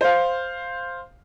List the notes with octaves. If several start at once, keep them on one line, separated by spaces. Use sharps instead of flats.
C5 F5